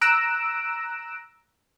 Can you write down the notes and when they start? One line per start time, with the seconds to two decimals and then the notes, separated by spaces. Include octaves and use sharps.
0.01 A#5 E6 F#6 A#6 D7 E7